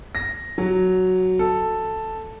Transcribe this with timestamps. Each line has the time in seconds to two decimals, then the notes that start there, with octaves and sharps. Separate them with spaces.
0.15 A#6
0.58 F#3
1.39 A4